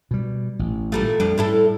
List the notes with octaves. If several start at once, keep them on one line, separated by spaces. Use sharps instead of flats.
B2 G3
A1
A#2 G3 A3
F2 G3 D4
A2 E4 A4